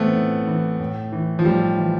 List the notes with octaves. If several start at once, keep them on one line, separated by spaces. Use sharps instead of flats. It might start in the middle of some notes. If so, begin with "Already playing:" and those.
Already playing: A2 E3 A3 B3 C4
A2
E3
A2
E3
F3
A2 G3
E3